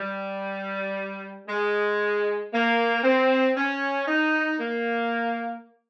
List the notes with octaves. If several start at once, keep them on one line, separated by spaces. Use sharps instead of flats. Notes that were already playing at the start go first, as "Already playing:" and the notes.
Already playing: G3
G#3
A#3
C4
C#4
D#4
A#3